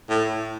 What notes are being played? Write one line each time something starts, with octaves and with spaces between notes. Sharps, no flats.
A2